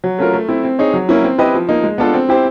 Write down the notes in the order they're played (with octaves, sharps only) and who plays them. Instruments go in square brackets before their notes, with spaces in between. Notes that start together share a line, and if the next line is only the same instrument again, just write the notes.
[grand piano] F#3
A3 C#4 F4 A#4
A3
C4 E4
C4
D#4 G#4 C#5
F#3
A#3 C#4 E4
C4
E4 G4 B4 D#5
F3
A#3 D#4
G#3
B3 D4 F4 A4
C4
E4 G4 C5